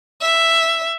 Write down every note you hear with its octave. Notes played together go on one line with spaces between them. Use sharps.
E5